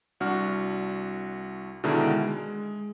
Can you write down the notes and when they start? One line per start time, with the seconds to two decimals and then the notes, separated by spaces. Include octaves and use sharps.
0.20 C2 D4 F#4 F6
1.84 B2 D3 D#3 G#3 E4 A#4
2.27 G#3